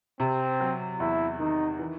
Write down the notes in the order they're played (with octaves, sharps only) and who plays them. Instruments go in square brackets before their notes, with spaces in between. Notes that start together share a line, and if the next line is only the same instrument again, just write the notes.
[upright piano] C3 [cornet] C4
[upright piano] F#3
[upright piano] E2 [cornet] E4
[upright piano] D#3 [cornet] D#4
[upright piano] E3